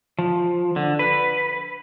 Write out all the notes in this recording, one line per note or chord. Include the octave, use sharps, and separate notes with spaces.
F3
D3
B4